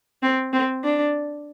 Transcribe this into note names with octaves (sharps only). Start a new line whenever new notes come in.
C4
C4
D4